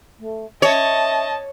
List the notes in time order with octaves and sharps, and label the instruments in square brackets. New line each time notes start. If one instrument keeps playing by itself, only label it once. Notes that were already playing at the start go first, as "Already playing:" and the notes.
[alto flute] A3
[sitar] C#5 [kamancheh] D#5 A5 [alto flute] E5